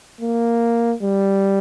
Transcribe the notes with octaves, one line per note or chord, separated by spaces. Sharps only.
A#3
G3